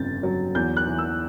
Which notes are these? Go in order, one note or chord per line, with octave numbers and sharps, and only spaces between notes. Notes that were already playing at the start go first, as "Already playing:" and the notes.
Already playing: G1 F2 C#3 G6 A6
F#3
E2 G6
F#6
E3
E6